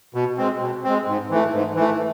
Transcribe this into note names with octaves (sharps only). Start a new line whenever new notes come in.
B2
G#3 C4
B2
G#3 C4
G#2
E3 A3
G#2
E3 A3